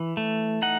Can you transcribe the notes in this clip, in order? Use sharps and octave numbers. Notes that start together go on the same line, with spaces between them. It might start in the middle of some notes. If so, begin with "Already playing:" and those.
Already playing: E3
A3
D#4 F#5